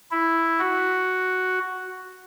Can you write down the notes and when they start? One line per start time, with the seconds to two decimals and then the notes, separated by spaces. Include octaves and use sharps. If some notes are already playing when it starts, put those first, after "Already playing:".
0.11 E4
0.59 F#4